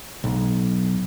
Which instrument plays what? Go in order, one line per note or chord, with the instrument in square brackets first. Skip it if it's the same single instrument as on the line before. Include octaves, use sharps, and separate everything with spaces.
[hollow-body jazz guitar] B1